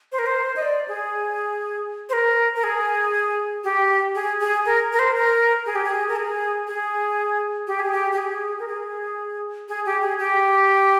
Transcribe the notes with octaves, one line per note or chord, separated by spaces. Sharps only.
C5
A#4
C5
D#5
D5
G#4
C5
A#4
A#4
G#4
G4
G#4
G#4
A#4
A#4
C5
A#4
G#4
G4
G#4
A#4
G#4
G#4
G4
G#4
G4
G4
G#4
A#4
G#4
G#4
G4
G#4
G4